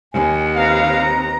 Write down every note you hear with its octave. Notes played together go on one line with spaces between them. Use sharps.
D#2 G#5
C4 B4 F5 A#5